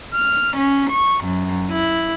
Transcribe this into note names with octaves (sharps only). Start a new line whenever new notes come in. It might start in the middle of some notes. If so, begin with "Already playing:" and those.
F6
C#4
C#6
F#2
E4